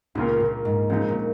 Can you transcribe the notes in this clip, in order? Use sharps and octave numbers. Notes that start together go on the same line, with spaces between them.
C#2 A#2 C#3 A#3 C#4 F4
A#2
G#2
F2 A#2 C#3 G#3 D#4
A#2